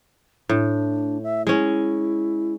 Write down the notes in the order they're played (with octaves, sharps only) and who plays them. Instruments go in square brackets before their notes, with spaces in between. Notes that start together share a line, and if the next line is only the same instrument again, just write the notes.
[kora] A2 [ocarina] D4
[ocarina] E5
[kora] G#3 C#4 [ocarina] E4